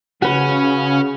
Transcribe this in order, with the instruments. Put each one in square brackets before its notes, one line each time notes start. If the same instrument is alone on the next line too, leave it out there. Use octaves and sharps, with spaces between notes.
[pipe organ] C#3 [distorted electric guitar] C#4 [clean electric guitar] F#4 B4